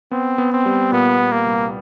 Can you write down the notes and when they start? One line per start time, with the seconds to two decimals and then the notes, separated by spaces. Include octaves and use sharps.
0.11 B3 C4
0.38 B3
0.52 C4
0.66 G3
0.92 A#2 B3
1.19 A#2
1.32 A#3
1.46 C2